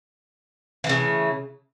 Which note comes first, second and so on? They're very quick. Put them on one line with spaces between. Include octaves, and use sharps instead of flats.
E3 A3 C#3